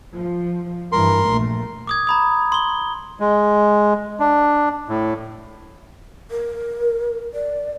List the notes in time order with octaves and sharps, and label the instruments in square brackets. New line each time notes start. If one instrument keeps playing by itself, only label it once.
[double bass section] F3
[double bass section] G2 E3 [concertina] A#4 C6
[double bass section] A#1 A#2 A3
[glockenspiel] D6 D#6 G#6
A#5 B5 D#6
C6 G7
[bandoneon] G#3
D4
A2
[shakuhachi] A#4
D5